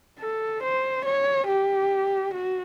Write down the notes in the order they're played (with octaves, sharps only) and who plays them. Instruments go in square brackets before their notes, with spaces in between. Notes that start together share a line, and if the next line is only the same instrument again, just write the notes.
[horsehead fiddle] A4
C5
C#5
G4
F#4